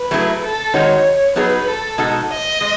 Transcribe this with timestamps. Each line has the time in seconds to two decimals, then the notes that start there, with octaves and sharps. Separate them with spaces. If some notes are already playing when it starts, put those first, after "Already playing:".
Already playing: B4
0.11 F#3 A3 E4 G#4
0.42 A4
0.73 D#3 G#3 D#4 F#4 C#5
1.36 F#3 B3 D#4 G#4 B4
1.67 A4
1.98 B2 G#3 D#4 F#4 A4
2.30 D#5
2.61 G#3